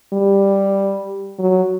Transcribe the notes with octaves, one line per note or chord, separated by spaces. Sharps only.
G3
F#3